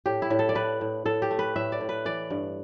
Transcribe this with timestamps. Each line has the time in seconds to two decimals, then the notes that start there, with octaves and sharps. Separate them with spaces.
0.06 A2 G4
0.22 E4
0.30 A2
0.39 A4
0.49 D5
0.55 A2 B4
0.81 A2
1.05 A2 A4
1.22 G4
1.31 A3
1.39 B4
1.56 A2 E5
1.72 D5
1.81 A2
1.89 B4
2.05 E3 D5
2.30 G2